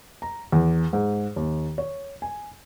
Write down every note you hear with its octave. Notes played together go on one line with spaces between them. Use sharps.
A#5
E2
G#2
D#2
C#5
G#5